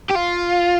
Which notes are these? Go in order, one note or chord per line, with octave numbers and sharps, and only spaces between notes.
G4
F4